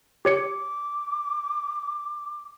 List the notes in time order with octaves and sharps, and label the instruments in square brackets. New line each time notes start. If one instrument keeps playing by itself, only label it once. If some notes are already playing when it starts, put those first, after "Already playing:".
[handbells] G4 C#5 C#7 [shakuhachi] D6